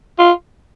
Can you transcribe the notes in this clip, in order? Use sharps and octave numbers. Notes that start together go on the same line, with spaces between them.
F4